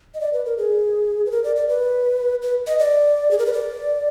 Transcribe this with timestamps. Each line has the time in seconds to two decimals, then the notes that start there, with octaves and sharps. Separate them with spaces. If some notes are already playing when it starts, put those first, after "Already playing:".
0.14 D#5
0.21 D5
0.33 B4
0.46 A#4
0.58 G#4
1.26 B4
1.31 A#4
1.44 D5
1.56 D5
1.69 B4
2.42 B4
2.67 D#5
2.79 D5
3.31 G#4
3.39 A#4
3.46 B4
3.53 D5